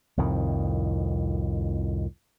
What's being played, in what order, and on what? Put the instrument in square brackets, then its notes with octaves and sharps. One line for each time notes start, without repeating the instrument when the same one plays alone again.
[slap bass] C2 F2 A2 D#3